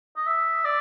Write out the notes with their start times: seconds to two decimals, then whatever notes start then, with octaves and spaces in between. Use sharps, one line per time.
0.16 D#5
0.27 E5
0.64 D5